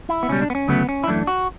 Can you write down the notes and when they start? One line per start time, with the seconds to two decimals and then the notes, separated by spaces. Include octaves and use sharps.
0.09 E4
0.23 B3
0.29 C#2 B2 G3 C#4
0.42 D4
0.50 B3
0.55 C#4
0.68 D2 C#3 F#3 A3 B3
0.89 C#4
1.04 E4
1.07 F#2 E3 A3 D4
1.27 F#4